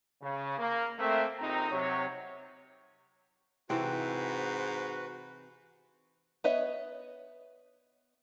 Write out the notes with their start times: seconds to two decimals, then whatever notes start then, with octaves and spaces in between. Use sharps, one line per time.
0.22 C#3
0.59 A#3
0.99 A3 A#3 C4 E5
1.39 A#1 C4 D#4 A#5
1.72 C3 F#3 C#5
3.70 G#2 C3 E3 C4 F#4 B4
6.44 B3 B4 C#5 D#5 E5